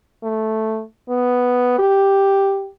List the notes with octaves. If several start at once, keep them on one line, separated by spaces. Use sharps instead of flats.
A3
B3
G4